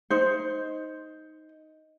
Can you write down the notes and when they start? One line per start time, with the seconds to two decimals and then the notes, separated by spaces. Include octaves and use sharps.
0.10 D#4 C5